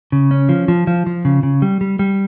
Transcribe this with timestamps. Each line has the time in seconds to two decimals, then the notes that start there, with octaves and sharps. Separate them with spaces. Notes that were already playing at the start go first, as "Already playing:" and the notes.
0.12 C#3
0.31 C#4
0.49 F3
0.68 F3
0.87 F3
1.06 F3
1.25 C#3
1.43 C#3
1.62 G3
1.81 G3
1.99 G3